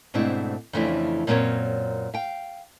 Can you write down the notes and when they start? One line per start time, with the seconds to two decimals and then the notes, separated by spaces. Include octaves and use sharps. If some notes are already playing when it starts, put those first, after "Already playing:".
0.14 G#2 B2 A3 C4 D4 E4
0.73 F2 C#3 E3 A3 D4 E4
1.27 F#2 A#2 C4 A#4 C#5
2.14 F5 G5